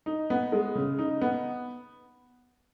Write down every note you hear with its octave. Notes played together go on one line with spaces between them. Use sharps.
D#4
B3
G#3
C#3
D#4
B3